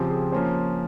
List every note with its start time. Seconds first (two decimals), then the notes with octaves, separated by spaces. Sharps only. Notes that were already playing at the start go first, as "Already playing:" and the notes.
Already playing: C#3 F3 C4 G4
0.10 G#4
0.32 F3 A#3 C#4 C5